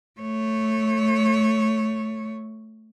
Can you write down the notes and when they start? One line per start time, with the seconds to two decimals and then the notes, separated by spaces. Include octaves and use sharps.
0.20 A3 C#5